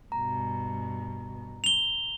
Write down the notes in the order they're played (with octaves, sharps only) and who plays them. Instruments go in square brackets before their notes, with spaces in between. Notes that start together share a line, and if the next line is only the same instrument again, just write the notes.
[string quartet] G2 B2 [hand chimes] A#5
[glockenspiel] F7 G7